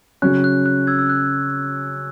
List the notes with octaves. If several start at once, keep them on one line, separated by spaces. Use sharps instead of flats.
C#3 F#3 C#4 F#6
F#6
F#6
E6 G#6
E6
F#6